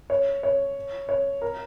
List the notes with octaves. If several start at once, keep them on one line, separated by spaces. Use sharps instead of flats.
C#5
C#5
C#5
A#4